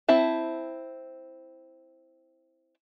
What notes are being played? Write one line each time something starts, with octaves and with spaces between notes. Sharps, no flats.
C4 E4 E5 A5